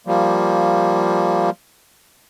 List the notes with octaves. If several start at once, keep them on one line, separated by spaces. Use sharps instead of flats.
F3 G3 A#3